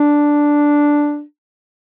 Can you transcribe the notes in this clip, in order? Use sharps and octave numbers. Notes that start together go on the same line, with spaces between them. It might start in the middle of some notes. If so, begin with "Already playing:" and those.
Already playing: D4